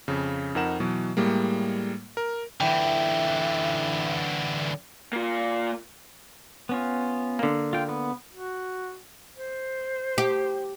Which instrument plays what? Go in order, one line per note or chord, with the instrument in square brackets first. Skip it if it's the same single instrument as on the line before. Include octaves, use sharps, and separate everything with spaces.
[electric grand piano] F2 C#3
F2 D#4 A#4 F#5 E7
B2 E3 F#3
A2 G3 G#3 A#3
A#4
[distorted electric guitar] D3 E3 [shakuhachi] E5 [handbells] G5
[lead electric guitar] A#3 F4
[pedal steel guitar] B3 C#4 F4
[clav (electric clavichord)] D3 A#3
[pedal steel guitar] F4 G5
B3
[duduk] F#4
C5
[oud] G4